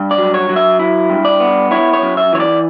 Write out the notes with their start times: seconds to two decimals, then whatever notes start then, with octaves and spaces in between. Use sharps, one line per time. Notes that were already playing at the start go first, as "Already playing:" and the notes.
Already playing: G2
0.11 D5
0.18 F#3
0.34 C#5
0.49 F#3
0.56 E5
0.79 E4
1.10 G2
1.25 D5
1.40 B3
1.71 E4 C#5
1.93 C#5
2.02 F#2
2.17 E5
2.33 E3 C#5
2.40 D5